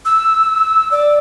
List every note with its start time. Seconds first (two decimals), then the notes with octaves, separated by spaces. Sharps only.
0.05 E6
0.91 D5